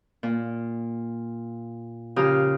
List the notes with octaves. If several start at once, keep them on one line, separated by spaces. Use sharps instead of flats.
A#2
C#3 F3 G4 A#4 D#6 F6